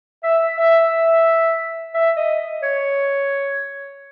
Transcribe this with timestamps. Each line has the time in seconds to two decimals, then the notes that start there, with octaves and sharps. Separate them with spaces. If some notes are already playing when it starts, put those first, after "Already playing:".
0.23 E5
0.58 E5
1.94 E5
2.17 D#5
2.63 C#5